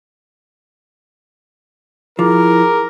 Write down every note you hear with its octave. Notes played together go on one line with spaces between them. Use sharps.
F3 E4 G#4 A#4 D6